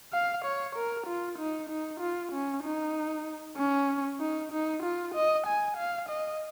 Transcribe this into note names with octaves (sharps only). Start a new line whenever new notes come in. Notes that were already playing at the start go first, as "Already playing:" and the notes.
F5
C#5
A#4
F4
D#4
D#4
F4
C#4
D#4
C#4
D#4
D#4
F4
D#5
G#5
F5
D#5